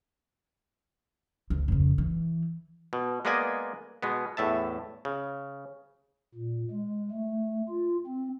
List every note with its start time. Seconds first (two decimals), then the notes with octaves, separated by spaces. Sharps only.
1.50 D2
1.68 F2 C#3
1.98 E3
2.93 B2
3.25 G#3 A#3 B3 D5 D#5 G#5
4.03 B2 G#3 B3
4.37 E2 A2 E5 A5
5.05 C#3
6.35 A#2
6.71 G#3
7.11 A3
7.69 F4
8.07 C4